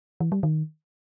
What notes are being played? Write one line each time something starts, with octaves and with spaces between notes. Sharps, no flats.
E3
G3
D#3